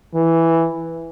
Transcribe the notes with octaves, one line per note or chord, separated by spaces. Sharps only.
E3